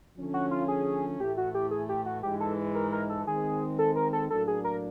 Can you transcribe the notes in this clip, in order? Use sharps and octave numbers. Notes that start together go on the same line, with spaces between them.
D3 F3 A3 C#4
F#4
F4
G#4
A2 E3 A3 G4
F#4
G4
G#4
G4
F#4
G#2 E3 G#3 G4
A4
A#4
A#4
A4
D#3 G#3 C4 G#4
A4
A#4
A4
A2 F#3 A#3 D4 A4
G#4
A#4